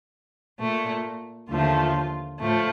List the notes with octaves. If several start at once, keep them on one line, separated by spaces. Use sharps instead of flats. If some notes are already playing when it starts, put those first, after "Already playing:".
A#2 A3
D#2 D3 F3 A3 F4
A2 F3 A3